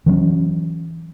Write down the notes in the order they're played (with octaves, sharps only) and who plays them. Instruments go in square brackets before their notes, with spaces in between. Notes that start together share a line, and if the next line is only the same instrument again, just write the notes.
[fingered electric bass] E3 F#3 B3 C#4